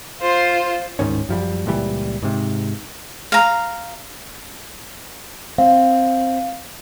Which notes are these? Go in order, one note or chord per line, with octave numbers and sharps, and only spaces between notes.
F4 C5
D1 G#2 D#3 C#4
F#2 F3 G3
C#2 A#2 E3 G3
G#2 C3
F5 A#5
C4 F5